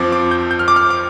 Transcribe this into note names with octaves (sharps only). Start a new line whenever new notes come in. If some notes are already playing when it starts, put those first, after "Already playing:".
Already playing: F2 F3 C4 D6
D6
G6
G6
F6
D6
F6
D6